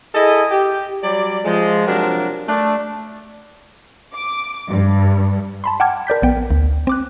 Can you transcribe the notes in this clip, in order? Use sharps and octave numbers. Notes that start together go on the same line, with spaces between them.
E4 G#4 A4 D#5
G4
F#3 G3 D5
F3 G#3
C3 F3 F#3 D4 A#4
A3 D4
D6
G2
A5 B5 C6
F#5 G5 A5 D6 F6 G#6
A#4 D5 G6 B6
A#1 B3 G5
D2
C4 D6 F#6